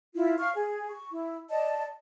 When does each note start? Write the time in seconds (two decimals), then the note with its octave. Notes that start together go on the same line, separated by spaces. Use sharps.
0.15 E4 F4
0.39 F5 C#6 F6
0.55 G#4
0.90 C#6
1.11 E4
1.50 D5 D#5 A5